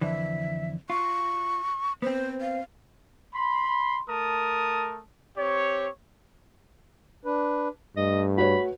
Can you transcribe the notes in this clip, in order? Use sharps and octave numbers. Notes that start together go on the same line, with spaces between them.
F2 D3 E3 E5
F4 C#6
B3 C4 C5
F5
B5 C6
A3 A#4 A5 D#6
C4 G4 C#5
D4 B4
G2 A3 D#5
F#4 B4 C#5 B5